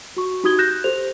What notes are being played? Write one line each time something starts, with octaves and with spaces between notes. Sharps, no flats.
F#4 C#6
D#4 F#4 G4 D#6 G#6 G7
F#6 G6 A#6 E7
G4 A4 C5 F7